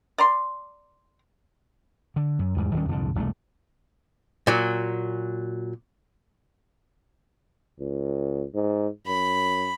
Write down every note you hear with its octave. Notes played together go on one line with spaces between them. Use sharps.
D5 A#5 C6
D3
F#2
E2 G#2 G3
D1 D#3 G3 C#4
C2 F2 G#2 D3
E1 C2 F2 A3
A#2 F#3
C#2
G#2
F#2 B5